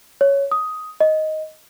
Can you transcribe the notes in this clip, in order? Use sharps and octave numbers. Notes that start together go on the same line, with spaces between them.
C#5
D#6
D#5